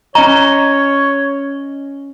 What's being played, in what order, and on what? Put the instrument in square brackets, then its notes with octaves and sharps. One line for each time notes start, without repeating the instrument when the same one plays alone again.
[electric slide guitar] C#4 D#5 [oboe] C#5 [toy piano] A#5